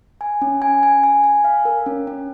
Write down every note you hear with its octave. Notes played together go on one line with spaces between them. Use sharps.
G#5
C#4
G#5
G#5
G#5
G#5
F5
A#4
C#4
C#4